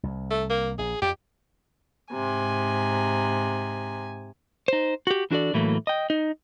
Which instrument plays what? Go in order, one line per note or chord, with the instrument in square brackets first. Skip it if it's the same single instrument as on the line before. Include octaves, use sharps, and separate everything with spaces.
[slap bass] C2
[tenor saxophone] A3
A#3
[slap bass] A#1 [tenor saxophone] G#4
[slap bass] F2 [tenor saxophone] G4
[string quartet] G#2 C3 G#5
[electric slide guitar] D#4 C5
F#4 G4
E3 D4 F#4 A4 D5
A2 E3 F#3 A3 A#3
D#5 G5
D#4